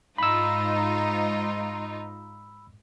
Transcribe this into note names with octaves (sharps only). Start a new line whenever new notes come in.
G#2 D#4 F4 B5 E6